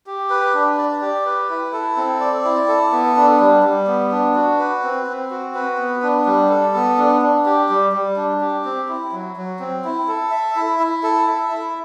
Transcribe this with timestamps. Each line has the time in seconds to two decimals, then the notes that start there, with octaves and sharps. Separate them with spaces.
0.07 G4
0.30 B4
0.54 D4
0.78 D5
1.01 G4
1.25 B4
1.49 E4
1.73 A4
1.97 C4
2.20 D5
2.45 E4
2.68 A4
2.92 B3
3.17 D4
3.40 G3
3.63 G3
3.87 B3
4.12 D4
4.35 F#4
4.59 B4
4.84 C4
5.07 C4
5.31 F#4
5.54 B4
5.78 B3
6.03 D4
6.26 G3
6.50 A4
6.74 B3
6.98 D4
7.22 D4
7.46 G4
7.69 G3
7.93 G3
8.17 D4
8.41 G4
8.65 C4
8.89 E4
9.12 F#3
9.37 F#3
9.60 C4
9.84 E4
10.08 A4
10.31 E5
10.56 E4
10.80 E4
11.03 A4
11.27 E5
11.51 E4